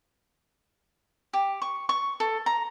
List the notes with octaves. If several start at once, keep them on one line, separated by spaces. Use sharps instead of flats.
G4
C#6
C#6
A4
A#5